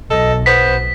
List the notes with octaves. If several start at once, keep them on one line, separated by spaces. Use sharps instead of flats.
B1 A4 D#5
B3 C5 B6